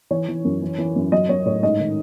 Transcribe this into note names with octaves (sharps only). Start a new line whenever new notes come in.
E3 C#5
E3
F#2
E3
E3
F#2
F#3 D#5
F#3 C#5
A2 C#5
G#2 D#5
D#3